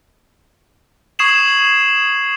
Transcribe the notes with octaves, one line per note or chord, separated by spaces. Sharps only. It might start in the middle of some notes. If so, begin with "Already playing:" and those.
C#6 D#6 G#6 C7 E7 F#7